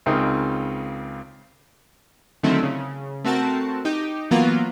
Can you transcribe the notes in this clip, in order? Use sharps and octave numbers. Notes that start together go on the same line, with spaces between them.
C#2 C#3 C4 D#4 A#4 D#6
D3 D#3 F#3 A3 C4 E4
C#3
A3 C4 F#4 A#4 A5
D#4 G4
E3 F#3 A#3 B3 F4